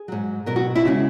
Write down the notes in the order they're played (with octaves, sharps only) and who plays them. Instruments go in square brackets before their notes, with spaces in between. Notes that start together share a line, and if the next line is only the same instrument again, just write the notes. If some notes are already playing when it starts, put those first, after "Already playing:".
Already playing: [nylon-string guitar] G#4
G#2 F#3
B2 F#3 A#4
F#4
E4
C#3 G#3 F#4